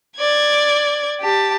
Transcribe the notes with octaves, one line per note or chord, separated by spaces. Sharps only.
D5 G#6
G4 A5